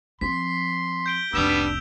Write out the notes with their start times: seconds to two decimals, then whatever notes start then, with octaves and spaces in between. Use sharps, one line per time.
0.21 F3 C4 C6 B6
1.06 G6 D7 G7
1.33 F1 C2 G3 B3 D4 E6 E7 F7